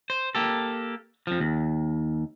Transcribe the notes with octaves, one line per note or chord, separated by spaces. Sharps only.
C5
A#3 G4 A4
F2 F3
D#2